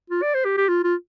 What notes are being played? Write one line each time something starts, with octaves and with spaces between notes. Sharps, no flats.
F4
D5
C5
G4
G4
F4
F4